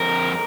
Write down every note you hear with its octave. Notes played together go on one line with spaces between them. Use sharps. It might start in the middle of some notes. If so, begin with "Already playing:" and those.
Already playing: F2 A#4